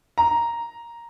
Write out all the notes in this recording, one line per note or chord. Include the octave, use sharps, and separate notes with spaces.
A#5